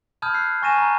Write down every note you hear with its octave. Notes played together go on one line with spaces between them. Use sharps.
A5 B5 D#6 F6 G6 G#6
E6 F#6 C7
G#5 C#6 A6 A#6 D#7 E7
A#5